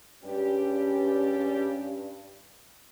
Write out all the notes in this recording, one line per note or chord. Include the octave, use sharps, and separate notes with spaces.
G2 G3 G#3 C#4 G4